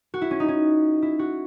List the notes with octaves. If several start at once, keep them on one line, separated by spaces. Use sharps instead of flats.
F#4
E4
C#4
D#4
C#4
E4
F#4